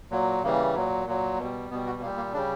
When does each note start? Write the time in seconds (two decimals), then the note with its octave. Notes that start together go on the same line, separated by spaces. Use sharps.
0.11 A#2 F#3
0.44 C#3 E3 G3 A#3
0.75 A#2 F#3
1.07 A#2 F#3
1.38 B2
1.44 G3
1.70 B2 G3 B3
1.86 F#4
2.02 A#2 A#3
2.05 G3
2.17 A#3
2.33 C#3 D4
2.37 G3